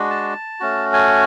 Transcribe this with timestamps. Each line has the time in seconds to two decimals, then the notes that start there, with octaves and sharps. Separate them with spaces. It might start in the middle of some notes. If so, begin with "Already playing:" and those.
Already playing: G#3 D4 F#4
0.10 A5
0.60 A3 C#4 F#4
0.93 G#5